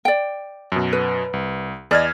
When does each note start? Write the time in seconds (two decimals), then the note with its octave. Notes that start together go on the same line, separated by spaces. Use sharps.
0.05 D5 G5
0.72 F#2 B2
0.93 B4
1.33 C2
1.91 E2 D5 D#5 F6 G#6